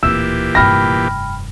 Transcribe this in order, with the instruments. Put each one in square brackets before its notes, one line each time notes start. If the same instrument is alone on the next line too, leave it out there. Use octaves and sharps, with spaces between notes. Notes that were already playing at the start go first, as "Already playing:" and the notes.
[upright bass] D1 A#3 [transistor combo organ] A#2 E3 G4 [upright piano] E6 [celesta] E7
[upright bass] F1 G2 [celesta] G5 B5 F6 [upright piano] A#6